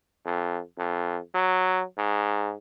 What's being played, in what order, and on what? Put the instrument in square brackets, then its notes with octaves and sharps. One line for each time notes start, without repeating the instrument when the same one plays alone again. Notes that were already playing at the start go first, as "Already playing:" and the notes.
[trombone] F2
F2
F#3
G#2